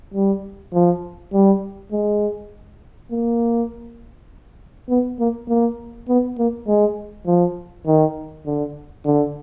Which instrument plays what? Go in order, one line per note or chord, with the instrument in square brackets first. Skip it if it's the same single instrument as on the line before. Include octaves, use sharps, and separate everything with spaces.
[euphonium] G3
F3
G3
G#3
A#3
B3
A#3
A#3
B3
A#3
G#3
F3
D#3
D3
D3